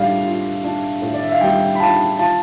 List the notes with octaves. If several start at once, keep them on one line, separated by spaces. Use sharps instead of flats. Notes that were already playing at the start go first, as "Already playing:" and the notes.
Already playing: A2 G3 D4 D5 F5
F4
D4
A2
D5
E5
F5
G3 G5
B5
F4 A5
F4 A5